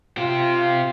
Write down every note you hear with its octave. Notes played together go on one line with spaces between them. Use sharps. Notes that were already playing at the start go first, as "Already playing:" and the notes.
C4 F4 G4